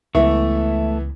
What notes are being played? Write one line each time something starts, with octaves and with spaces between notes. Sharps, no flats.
C#2 E3 A3 B3 E4 E5 C#6